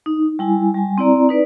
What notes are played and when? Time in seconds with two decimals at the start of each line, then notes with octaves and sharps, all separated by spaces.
0.06 D#4
0.39 G3 E4 G#5
0.75 G3 G#5
0.98 C4 E4 D5 A#5
1.29 D#4 B4 D5